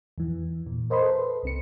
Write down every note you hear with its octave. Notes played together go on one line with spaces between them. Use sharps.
E2 E3
A#2
A#4 C5 D#5 B5 C6
A4 B4
C2 C4 C#7